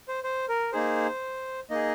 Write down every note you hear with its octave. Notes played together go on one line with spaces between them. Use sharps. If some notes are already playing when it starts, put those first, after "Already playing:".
C5
C5
A#4
A#3 D#4 G#4 C5
A#3 D#4 G#4 D#5